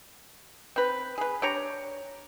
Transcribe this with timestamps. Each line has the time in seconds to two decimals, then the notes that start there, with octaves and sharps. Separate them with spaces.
0.76 C4 B4
1.18 G#4 B4
1.42 D4 G4 C#5 A#5